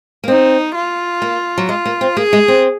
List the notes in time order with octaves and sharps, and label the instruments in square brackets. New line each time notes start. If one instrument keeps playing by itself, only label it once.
[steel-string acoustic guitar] A#3
[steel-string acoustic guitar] C4 [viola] D#4
[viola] F4
[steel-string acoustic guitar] A#3
F#3
[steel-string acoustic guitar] G#3 [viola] F4
[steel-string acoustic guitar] A#3
C4
[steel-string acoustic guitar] A#3 [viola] G#4
[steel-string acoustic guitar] G#3
C4